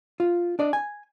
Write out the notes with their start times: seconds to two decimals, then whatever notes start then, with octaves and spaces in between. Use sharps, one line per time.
0.20 F4
0.59 D4 D5 D#5
0.73 G#5